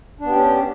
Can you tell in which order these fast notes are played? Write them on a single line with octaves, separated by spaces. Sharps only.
D4 B3 G4 C#4